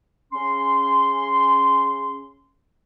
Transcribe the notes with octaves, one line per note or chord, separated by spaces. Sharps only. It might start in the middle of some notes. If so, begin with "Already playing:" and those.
C#3 C#4 C6